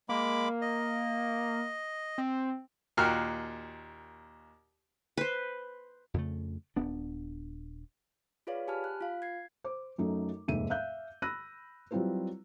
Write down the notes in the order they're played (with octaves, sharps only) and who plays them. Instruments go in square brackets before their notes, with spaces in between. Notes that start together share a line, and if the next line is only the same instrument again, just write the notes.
[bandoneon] G#3 B5 D6 [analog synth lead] A#3
[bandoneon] D#5
[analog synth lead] C4
[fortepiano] D#2 A#2 F#4 G5 F6
[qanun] B4 C5
[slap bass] F2 C#3 A3
D#1 B3 D4
[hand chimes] F4 G#4 B4 C#5 D5 F5
G4 G#5 A5 B5 F6
F#6
F4 F5
G#6 C7
[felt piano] C5 D6
F#2 F#3 A3 D#4
F1 D#2 G#2 E5 D#7
E5 F5 F#6 G6
B5 E6 F#6 A#6 D#7
F#3 G3 C4 E4 F4 B4